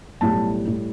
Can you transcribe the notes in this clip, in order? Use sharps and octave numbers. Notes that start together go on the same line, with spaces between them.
B1 A2 G3 A5
A2 G3